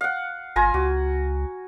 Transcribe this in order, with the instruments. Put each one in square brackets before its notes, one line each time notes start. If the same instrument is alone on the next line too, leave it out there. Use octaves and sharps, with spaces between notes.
[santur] F5 F#5
[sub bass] G1 [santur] F4 G#5 A#5
[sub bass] C#2 [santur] F#4